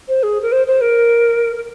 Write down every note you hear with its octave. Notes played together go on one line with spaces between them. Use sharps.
C5
G#4
A#4
C5
C5
A#4
A#4